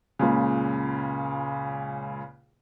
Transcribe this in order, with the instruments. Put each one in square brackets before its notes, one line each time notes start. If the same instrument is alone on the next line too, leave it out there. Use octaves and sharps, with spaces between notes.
[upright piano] C#2 A#2 C#3